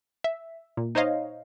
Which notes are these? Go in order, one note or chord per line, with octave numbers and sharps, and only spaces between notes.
E5
A#2
D#4 C5 C#5 D#5 F5